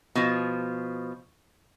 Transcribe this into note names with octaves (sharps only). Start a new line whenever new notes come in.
B2 F3